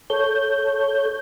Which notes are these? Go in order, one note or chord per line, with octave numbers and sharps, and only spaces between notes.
A4 C#5 G6